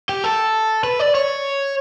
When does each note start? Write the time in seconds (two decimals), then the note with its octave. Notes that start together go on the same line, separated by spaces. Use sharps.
0.09 G4
0.24 A4
0.84 B4
0.99 D5
1.15 C#5